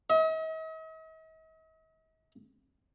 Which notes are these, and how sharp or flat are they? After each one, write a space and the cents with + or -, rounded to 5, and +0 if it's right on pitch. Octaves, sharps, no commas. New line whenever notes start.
D#5 +45